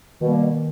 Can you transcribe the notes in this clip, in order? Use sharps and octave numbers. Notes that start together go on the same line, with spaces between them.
B2 D#3 G3 A#3